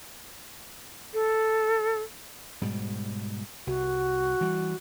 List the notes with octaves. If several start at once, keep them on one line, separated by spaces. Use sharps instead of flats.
A4
G#2 B2 G3
C2 F#4
E3 G3